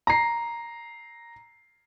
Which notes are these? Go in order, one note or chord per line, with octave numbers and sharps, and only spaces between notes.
A#5 C7